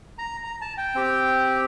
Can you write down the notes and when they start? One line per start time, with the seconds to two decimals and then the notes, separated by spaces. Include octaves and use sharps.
0.18 A#5
0.44 A#5
0.61 A5
0.78 G5
0.95 C4 G4